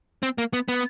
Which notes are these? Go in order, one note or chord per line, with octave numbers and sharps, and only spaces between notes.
C4
A#3
B3
B3